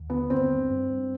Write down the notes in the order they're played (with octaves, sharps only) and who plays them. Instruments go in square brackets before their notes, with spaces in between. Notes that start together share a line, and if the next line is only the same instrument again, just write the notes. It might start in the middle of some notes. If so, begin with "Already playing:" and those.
Already playing: [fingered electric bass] D#2
[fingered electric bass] D3 [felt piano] B3
[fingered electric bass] G2 [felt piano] C4
[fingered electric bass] G2
G2
G2